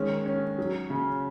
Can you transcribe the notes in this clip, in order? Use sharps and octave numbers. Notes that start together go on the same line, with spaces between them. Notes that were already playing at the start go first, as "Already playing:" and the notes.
Already playing: D#3 G#3 C#4
C#4
F#3
C#3